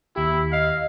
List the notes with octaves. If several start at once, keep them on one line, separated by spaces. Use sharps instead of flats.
D#2 E4 G4
D#5 F5